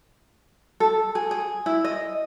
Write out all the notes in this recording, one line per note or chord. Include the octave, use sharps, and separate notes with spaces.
A4
G#4
G#4
E4
D#5